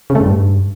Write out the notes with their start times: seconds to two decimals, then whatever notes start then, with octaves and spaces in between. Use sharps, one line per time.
0.10 C#3
0.15 A3
0.21 G#2
0.26 G2